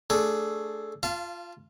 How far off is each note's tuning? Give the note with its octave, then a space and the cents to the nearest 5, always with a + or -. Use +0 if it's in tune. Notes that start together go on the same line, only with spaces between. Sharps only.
A3 +0 D4 +0 G#4 +10
F4 +0 F5 -30 A5 +0